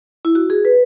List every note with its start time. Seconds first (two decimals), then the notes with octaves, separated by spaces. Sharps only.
0.25 E4
0.35 F#4
0.50 G#4
0.65 B4